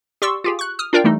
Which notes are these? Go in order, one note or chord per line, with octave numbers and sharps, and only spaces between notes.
G4 D5 C6 C#6 E6
F4 G4 G#4
C#6 F#6
D#6 F6
D4 F4 A#4 D5 F5 G5
E3 G3 A3 D#4